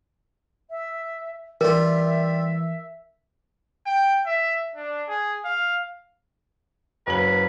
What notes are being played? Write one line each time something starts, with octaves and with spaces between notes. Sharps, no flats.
E5
E3 G3 F4 A#4 E5
G5
E5
D4
G#4
F5
F#1 F#3 B4 F#7